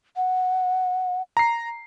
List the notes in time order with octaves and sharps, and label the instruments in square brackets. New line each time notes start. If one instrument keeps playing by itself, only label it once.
[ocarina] F#5
[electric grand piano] A#5 C7